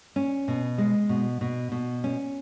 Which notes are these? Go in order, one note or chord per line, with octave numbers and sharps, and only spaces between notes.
C#4
B2
G#3
B2
B2
B2
C#4